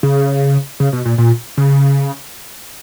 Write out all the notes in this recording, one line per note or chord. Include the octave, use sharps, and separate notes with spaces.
C#3
C#3
B2
A#2
A#2
C#3